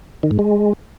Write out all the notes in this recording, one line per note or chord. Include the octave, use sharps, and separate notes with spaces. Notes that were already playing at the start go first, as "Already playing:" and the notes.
D#3
G#2
G#3